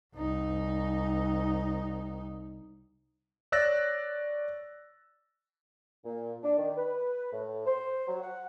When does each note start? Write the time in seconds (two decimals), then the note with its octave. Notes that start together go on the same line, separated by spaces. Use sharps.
0.16 C2 D#4
3.52 C#5 D5 E6 F#6 A6 A#6
6.05 A#2
6.43 D4
6.58 D#3
6.76 B4
7.32 A2
7.66 C5
8.08 F#3
8.22 F#5